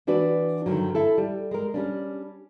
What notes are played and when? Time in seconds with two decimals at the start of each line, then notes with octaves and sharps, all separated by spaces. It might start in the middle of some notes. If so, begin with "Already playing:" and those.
0.07 E3 D4 F#4 B4 D5
0.66 G2 D3 D#3 F#3
0.95 E4 A4
1.18 G3
1.51 G#3 A#4
1.74 G3 C#4 D4